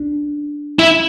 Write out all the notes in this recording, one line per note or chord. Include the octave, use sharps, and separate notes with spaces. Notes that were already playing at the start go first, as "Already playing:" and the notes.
Already playing: D4
E4